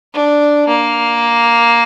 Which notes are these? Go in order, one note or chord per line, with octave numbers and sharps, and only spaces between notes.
D4
A#3